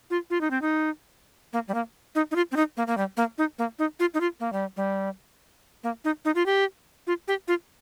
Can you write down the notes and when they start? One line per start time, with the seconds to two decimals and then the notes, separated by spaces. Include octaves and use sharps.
0.10 F4
0.30 F4
0.41 D#4
0.50 C4
0.62 D#4
1.53 A#3
1.68 G3
1.74 A#3
2.15 D#4
2.31 D#4
2.36 F4
2.51 C4
2.56 D#4
2.77 A#3
2.87 A#3
2.97 G3
3.17 A#3
3.38 D#4
3.58 A#3
3.79 D#4
3.99 F4
4.14 D#4
4.20 F4
4.40 A#3
4.53 G3
4.77 G3
5.83 A#3
6.04 D#4
6.25 D#4
6.35 F4
6.46 G4
7.07 F4
7.28 G4
7.48 F4